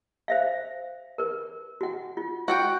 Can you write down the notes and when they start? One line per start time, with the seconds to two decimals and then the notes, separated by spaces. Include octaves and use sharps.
0.28 C5 E5 F5
1.18 A#4 B4
1.81 F#4 F#5
2.17 F4
2.48 F#4 F#5 G5